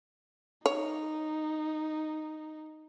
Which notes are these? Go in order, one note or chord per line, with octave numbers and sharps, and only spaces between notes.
D#4 C#5